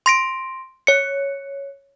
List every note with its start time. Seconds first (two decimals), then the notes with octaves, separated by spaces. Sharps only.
0.06 C6 A#6 D7
0.87 C#5 C#7